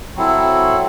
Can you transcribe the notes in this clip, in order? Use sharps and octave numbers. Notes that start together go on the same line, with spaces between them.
F#3 C4 E4 A4